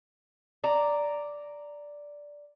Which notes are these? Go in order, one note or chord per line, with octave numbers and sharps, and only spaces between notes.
D5 A#5